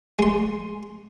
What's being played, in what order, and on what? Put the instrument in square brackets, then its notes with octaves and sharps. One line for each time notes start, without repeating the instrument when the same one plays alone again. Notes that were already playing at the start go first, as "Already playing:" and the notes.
[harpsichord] G#3 C6